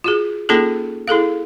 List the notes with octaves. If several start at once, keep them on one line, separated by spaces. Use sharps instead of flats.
F4 F#4 G#4
A#3 C#4 D#4 F4 G#4 A4
E4 G#4 A4 F5